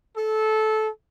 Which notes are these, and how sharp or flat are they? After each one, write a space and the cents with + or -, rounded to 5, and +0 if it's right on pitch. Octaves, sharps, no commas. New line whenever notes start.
A4 -20